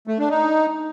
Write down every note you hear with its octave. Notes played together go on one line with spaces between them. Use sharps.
A3
D4
D#4